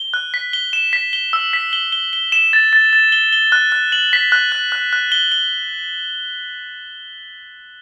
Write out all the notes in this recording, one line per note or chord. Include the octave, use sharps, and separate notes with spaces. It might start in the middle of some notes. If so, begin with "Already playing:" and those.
Already playing: G7
F#6
B6
G7
E7
B6
G7
E6
B6
G7
G7
G7
E7
A6
A6
A6
G7
G7
F#6
F#6
F#7
B6
F#6
F#6
F#6
F#6
G7
G7